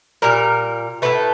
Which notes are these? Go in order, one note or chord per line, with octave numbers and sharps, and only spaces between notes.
A#2 G3 A#4
A2 F3 A3 B4